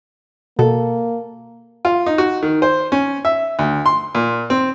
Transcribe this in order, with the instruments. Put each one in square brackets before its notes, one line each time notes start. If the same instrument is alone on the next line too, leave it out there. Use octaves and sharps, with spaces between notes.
[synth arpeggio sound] B2 [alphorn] A#3 [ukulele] A4
[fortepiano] F4
D#4
F#4
D#3
C5
C#4
E5
D2
C6
A#2
C4